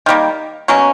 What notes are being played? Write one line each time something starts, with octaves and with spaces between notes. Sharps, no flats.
D#3 G3 A#3
B2 F#3 A#3 C#4